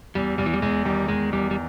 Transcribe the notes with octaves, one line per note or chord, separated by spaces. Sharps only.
E2 G3
E2 G3
E3
G3
E2 G#3
D#3 G3
E2 G#3
E2 G3
G3